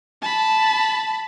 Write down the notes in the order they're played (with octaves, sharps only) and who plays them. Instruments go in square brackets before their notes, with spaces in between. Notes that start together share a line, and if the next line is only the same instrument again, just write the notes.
[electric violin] A5 B5